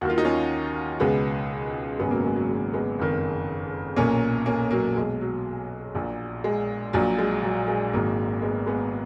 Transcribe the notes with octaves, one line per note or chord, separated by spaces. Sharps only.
D#2 D#3 F4 F#4
D#4
C#4 F4
C#2 B2 G#3 B3
G#1 F#2 C#3 G#3 B3
F#3 A#3
G#3
F#3
G#3
G#3 B3
F#1 F2 D#3
B1 A#2 A#3 C#4
A#3 C#4
F#3 A#3
B1 B2 G#3
F#3
A#1 A#2
G#3
A#1 A#2 F#3
G#3
F#3
G#3
G#1 G#2 D#3 F#3 A#3
G#3 B3
G#3 B3